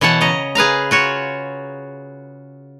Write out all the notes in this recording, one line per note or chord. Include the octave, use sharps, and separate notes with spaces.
B2 E3 C#5 F#5 A5
C#3 D#5 A#5
G#4 B4 F5 A#5
F4 F#4 C#5